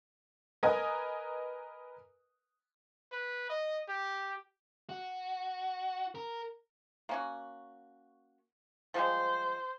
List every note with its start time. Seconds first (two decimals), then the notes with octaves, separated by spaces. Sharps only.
0.63 A#4 B4 D#5 G#5 D#6
3.12 B4
3.50 D#5
3.89 G4
4.89 F#4
6.15 A#4
7.09 A#3 C#4 F#4
8.94 F3 G3 G#3 C5